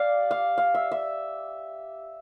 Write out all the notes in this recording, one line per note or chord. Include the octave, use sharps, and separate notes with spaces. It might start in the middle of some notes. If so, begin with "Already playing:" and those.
Already playing: G4 D5 F5
F5
F5
E5
E5